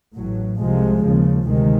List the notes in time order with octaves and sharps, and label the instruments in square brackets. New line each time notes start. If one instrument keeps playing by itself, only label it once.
[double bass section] A1 A2 F#3
C2 C3 F3 G#3
D#2 C#3 F3
D2 C3 D#3 G#3